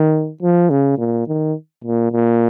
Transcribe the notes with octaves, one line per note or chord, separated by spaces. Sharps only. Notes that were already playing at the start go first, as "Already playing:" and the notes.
Already playing: D#3
F3
C#3
A#2
D#3
A#2
A#2